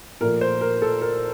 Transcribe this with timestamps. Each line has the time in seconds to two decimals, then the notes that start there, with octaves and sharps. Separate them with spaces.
0.21 A#2 F3 A3 A#4
0.41 C5
0.61 A#4
0.82 A4
1.02 A#4